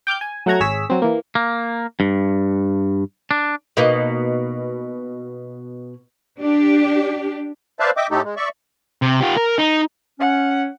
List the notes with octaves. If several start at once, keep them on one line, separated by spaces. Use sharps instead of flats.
G5 D6 F6 G6
G#5
F#3 A3 F#5 A#5 G#6
G#1 G#4 C#5 E6 B6
F#3 C4
E3 A#3
A#3
G2
D4
B2 A#3 D#4
D4 G4
B4 C5 D5 E5 F5 A5
D#5 E5 G5 D6
A2 A3 D#4 G4 A4
G#3
D5 E5 C#6
C3
F4 G4
A#4
D#4
C#4 F#5